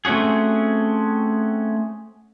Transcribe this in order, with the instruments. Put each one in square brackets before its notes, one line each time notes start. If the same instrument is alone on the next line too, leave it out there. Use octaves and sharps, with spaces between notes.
[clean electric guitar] A3 C4 C#4 F#4 G#4